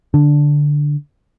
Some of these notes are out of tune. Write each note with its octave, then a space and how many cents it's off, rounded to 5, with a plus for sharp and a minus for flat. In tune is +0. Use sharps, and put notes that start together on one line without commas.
D3 +0 D4 -5